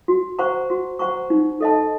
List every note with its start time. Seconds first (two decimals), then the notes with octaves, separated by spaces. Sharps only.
0.08 F#4
0.39 C5 F#5 A#5 C#6
0.70 F#4
0.99 C5 F#5 A#5 C#6
1.30 D#4
1.61 A4 D#5 A5